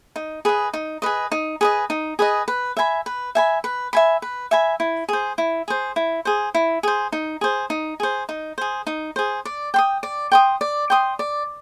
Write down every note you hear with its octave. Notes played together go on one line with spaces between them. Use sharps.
D#4
G#4 B4 D#5
D#4
G#4 B4 D#5
D#4
G#4 B4 D#5
D#4
G#4 B4 D#5
B4
E5 G#5 B5
B4
E5 G#5 B5
B4
E5 G#5 B5
B4
E5 G#5 B5
E4
G#4 C5
E4
G#4 C5
E4
G#4 C5
E4
G#4 C5
D#4
G#4 C5
D#4
G#4 C5
D#4
G#4 C5
D#4
G#4 C5
D5
G5 C6 D#6
D5
G5 C6 D#6
D5
G5 C6 D#6
D5